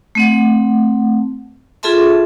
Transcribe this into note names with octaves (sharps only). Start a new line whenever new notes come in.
A3 C4 F#5
F4 G#4 A4 E5 A5 C6